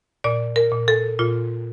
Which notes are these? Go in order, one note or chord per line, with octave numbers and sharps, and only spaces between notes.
A#2 D5
A#4
A#2
A4
A#2 F4